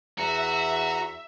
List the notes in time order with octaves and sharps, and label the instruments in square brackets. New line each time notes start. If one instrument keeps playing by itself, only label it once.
[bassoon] E2 [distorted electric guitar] F#4 [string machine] E5 [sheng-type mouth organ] A#5